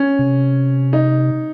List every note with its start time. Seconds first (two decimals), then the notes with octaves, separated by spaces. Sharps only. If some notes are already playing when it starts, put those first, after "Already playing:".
Already playing: C#4
0.19 C3
0.93 D#4